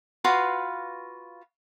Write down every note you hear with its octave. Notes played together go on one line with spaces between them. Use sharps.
F4 F#4 B4 F5